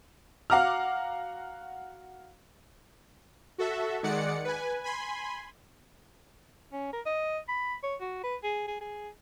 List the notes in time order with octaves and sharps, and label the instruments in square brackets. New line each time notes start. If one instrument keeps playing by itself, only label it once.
[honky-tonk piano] F#4 F5 F#5 A#5 D6 F6
[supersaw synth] F#4 A4 E5
D#3 G#3 D5 F#5 C#7
B4 G#5
G#5 B5 C6
[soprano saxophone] C#4
A#4
D#5
B5
C#5
F#4
B4
G#4
G#4
G#4